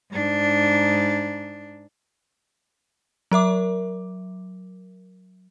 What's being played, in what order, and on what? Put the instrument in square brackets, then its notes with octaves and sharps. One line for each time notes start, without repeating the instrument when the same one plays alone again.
[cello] G#2 D4
[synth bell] F#3 A#4 E5 D6